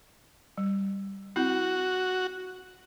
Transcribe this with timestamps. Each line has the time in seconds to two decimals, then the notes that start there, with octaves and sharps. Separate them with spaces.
0.58 G3
1.36 C4 E4 F#4